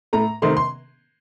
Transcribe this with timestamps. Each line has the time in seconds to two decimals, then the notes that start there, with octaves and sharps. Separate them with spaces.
0.13 A2 A3 A#5
0.42 C3 D#3 A3 C6
0.57 C6